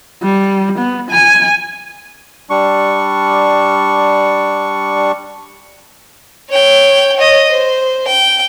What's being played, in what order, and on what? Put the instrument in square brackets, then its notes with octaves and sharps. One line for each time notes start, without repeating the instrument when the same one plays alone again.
[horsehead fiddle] G3
B3
G#5
[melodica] G3 D4 C#6
[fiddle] C#5 G5
C#5 D#5
C5
G5